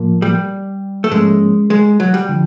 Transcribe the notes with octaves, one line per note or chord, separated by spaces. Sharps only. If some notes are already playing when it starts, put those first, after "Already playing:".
Already playing: A2 F3 A#3
G3
A3
G#2 F3 G#3 A#3 C#4
G#3
F#3
G3
D3 F3